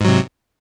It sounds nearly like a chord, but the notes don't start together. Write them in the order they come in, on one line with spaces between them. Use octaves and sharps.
G#2 F#3 C3